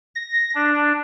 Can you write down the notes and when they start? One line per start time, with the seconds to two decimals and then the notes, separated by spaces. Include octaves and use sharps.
0.15 A#6
0.55 D4